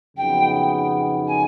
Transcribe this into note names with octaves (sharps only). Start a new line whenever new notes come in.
F2 C#3 F#3 B3 D#4 G5
G#5